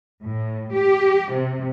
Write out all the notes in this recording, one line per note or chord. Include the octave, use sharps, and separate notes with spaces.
A2
G4
C3